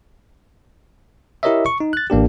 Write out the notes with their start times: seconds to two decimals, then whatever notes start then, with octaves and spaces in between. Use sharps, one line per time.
1.43 E4 G4 A#4 C#5 D#5 E5
1.66 C#6
1.80 D#4
1.93 F#6 A6
2.10 A1 A#3 D4 G4